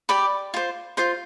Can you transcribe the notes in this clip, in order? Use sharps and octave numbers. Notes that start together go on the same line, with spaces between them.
G4 D5 B5
F4 C5
F4 C5 C6